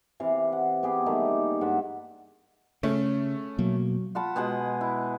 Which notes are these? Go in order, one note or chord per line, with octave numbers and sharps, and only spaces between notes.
C3 E3 F5
F#5
B3 G4 G#4
D#3 G3 A3 A#3
G2 G#3 E5 F#5
C#3 A3 C#4
B2 F#3 A#3
F4 F#5 A5 B5
B2 G#3 G#4 F#5
E4